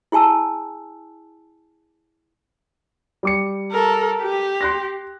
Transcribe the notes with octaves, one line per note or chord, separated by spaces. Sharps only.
E4 G#4 G#5 A5 E6
G3 D6 C#7
A4 A#4
G4
C6 F#6 A#6